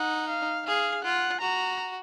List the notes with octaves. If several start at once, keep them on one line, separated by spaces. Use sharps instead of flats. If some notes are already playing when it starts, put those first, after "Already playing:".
Already playing: D#4 F#5
F5
G#4 F5
F4 F#5
F#4 A#5